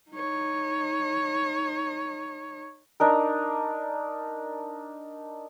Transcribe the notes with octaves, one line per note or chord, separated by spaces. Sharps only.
D#4 C#5
D4 D#4 A#4